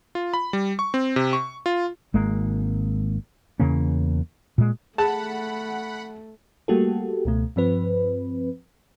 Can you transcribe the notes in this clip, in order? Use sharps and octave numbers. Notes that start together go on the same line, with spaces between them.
F4
B5
G3
C#6
C4
C3
C#6
F4
G#1 G#3 A#3
E2 C#3 A#3 C#4
A#2 G#3
A3 G#4 F#5 A5 B5
G3 A3 A#3 F#4 G4 A4
C#2 B2 A3
G2 F3 C4 B4